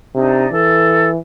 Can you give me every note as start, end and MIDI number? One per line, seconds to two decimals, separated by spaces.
0.15 0.46 48
0.15 0.50 62
0.15 0.50 63
0.52 1.18 52
0.52 1.09 69